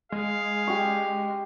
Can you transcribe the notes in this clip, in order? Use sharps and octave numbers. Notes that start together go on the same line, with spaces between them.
G#3 G#4 F5
G4 C#6